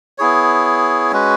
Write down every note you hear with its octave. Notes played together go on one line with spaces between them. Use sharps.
B3 E4 G#4 C#5
G#3 C#4 F#4 B4